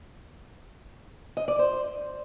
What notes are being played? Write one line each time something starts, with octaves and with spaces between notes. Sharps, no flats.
D#5
D5
C5